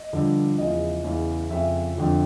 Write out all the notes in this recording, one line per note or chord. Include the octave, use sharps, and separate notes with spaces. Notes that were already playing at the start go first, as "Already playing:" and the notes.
Already playing: D#5
G2 D3 F3
E2 C#3 F3 D#5
E2 C#3 E3
F2 C#3 F3 E5
F2 D3 F3